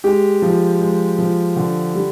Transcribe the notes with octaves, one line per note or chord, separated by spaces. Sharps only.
G#3 G4
F3
G#3
F3
D3
G3